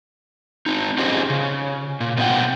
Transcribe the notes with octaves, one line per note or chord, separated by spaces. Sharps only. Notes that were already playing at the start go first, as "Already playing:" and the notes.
C4 D#4
C#4 F4 G4 G#4 C5 D#5
C#3
A#2
B2 C4 F4 B4 F#5 G5